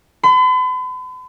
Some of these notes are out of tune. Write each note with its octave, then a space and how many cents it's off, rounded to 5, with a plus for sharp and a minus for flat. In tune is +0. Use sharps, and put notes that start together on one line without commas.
B5 +45